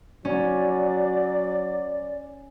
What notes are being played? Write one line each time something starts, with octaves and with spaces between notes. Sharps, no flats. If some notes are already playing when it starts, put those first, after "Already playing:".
F#3 C#4 D5